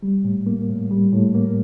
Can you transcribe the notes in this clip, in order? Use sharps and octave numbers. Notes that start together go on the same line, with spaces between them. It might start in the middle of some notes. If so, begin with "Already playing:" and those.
G3
A2
A#3
A2
G3
A2
A#3